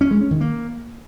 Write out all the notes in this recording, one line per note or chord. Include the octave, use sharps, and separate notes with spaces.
C#4
G#3
C#4
D#3
A#3